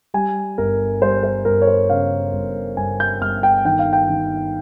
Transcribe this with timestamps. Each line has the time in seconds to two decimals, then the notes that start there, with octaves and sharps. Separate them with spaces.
0.14 G3 G#5
0.58 G1 A#4
1.01 G3 C5
1.24 C5
1.45 G1 A#4
1.62 C#5
1.67 C5
1.89 C#3 F5
2.33 G1
2.77 G1 G#5
3.00 G6
3.21 G1 F6
3.43 G5
3.65 D#3 G5
3.79 F5
3.93 G5
4.09 D#3